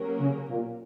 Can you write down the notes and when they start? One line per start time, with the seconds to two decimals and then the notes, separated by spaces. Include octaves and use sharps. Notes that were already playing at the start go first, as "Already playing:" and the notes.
Already playing: F#3 A#3 C#4 G4 A#4
0.20 C#3
0.49 A#2